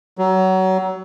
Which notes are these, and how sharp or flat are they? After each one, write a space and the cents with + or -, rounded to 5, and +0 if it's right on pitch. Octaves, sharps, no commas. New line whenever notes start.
F#3 +25